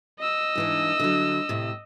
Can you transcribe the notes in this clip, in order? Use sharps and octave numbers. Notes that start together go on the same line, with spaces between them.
D#5 E6
G#2 E3 D4
D3 F#3
A2 C3